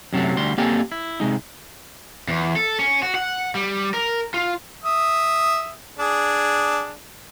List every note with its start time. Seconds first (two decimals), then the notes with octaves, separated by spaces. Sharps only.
0.13 F#2 C3 F#3 A3
0.37 D2 G3 C6
0.58 A#3 C4 G4 A4 G#5
0.92 E4
1.20 C3 G#3 D#4
2.28 E2
2.56 A4
2.79 C#4
3.02 F#4
3.15 F#5
3.55 G3
3.94 A#4
4.34 F4
4.84 E5 D#6
5.99 D4 G#4